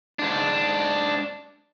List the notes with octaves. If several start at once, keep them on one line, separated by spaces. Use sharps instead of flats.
G#2 D4